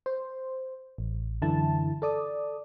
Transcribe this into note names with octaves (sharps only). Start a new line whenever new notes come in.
C5
A1
F#2 D3 E3 E4 A5
A4 D5 D#6